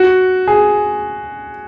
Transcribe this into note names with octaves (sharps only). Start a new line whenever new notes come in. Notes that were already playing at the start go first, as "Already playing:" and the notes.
Already playing: F#4
G#4